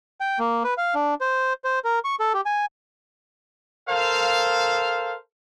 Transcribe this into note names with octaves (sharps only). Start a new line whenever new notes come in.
G5
A#3
B4
F5
D4
C5
C5
A#4
C#6
A4
G4
G#5
A4 A#4 C5 F5